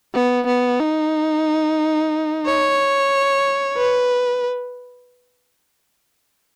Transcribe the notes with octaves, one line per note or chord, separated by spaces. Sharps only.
B3
B3
D#4
C#5
B4